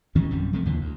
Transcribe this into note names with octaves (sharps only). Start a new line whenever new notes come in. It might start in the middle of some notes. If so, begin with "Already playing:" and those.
D2 D#3 E3 C#4
A#1 F#2 C3 G3
C3 F3 A3
D#2 A#2 D3 E3
D2